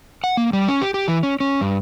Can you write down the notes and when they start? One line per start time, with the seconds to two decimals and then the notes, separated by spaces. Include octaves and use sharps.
0.24 F#5
0.37 A#3
0.53 G3
0.68 C#4
0.81 G4
0.94 G4
1.08 E3
1.23 C#4
1.40 C#4
1.61 G2